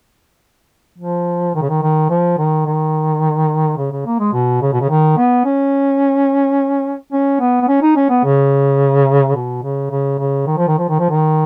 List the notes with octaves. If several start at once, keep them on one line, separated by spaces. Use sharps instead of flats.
F3
D#3
C#3
D#3
D#3
F3
D#3
D#3
C#3
C#3
A#3
G#3
B2
C#3
B2
C#3
D#3
B3
C#4
C#4
B3
B3
C#4
D#4
C#4
B3
C#3
B2
C#3
C#3
C#3
D#3
F3
D#3
F3
D#3
F3
D#3